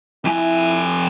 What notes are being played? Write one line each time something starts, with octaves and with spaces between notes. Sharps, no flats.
F2 E4 G#5